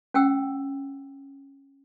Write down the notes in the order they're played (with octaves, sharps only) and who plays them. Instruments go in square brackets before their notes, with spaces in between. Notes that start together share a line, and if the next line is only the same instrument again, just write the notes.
[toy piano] C#4 F#5 G5 E6